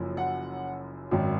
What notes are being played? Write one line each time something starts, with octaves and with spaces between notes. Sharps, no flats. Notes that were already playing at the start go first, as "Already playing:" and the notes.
Already playing: F#1 F#2 F3
F#5
G#1 F#2 D#3